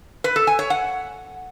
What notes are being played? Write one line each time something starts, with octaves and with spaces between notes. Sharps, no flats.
B4
A4
G#5
C#5
F#5